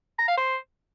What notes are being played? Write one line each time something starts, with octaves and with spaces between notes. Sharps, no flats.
A#5
F5
C5